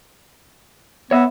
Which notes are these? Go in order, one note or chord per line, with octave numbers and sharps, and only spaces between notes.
B3 C#5 E5